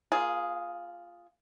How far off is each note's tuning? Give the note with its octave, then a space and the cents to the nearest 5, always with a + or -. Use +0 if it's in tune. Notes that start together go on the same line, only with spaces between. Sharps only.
A#3 +35 F4 +0 G#4 +0